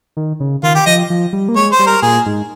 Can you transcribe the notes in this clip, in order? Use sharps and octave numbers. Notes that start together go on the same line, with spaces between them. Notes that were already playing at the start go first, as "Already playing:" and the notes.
D#3
C#3
D#3 F4
G4
F3 D#5
F3
G3
A#3
G#3 C#5
C5
G3
A#4
A#2 G#4
G#2